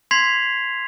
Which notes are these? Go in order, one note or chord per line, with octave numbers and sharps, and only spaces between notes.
C6 G#6 B6 C7 F7